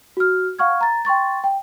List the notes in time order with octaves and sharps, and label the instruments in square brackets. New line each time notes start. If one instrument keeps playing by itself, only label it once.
[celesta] F#4 F6
F5 F#5 C#6 F6 G#6
A#5 A6
G5 C6 C#6 A6
G5